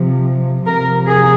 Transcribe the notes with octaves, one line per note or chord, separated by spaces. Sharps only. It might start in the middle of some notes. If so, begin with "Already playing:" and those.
Already playing: C3 F3
C3 F3 A#4
G#4